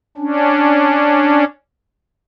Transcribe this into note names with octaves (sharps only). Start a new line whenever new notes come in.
C#4 D4